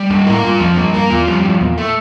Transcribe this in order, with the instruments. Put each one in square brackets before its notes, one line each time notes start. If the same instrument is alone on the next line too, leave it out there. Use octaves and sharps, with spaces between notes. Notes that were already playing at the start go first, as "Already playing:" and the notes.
Already playing: [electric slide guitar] G3
[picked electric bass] G2 [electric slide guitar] A#3
[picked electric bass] A2 [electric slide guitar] A#4
[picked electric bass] G2 [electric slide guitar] F4
[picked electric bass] F2 [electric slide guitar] F3
[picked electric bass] G2 [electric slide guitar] A#3
[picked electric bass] G2 [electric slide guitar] A#4
[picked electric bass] E2 [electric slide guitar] F4
[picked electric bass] F2 [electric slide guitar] G3
[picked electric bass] G2 [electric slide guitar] F3
[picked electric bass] E2 [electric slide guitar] A#2
[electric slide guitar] A3